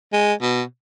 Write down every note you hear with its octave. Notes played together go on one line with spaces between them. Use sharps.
G#3
B2